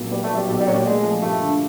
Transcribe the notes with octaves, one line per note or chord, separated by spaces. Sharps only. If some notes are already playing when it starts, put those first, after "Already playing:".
Already playing: B1 A#2 F#3
G3 B3
A3
F#3
G3
B1 G3
G3
A#2 F#3
G3
G#3 A3
F3
G2 A3
D3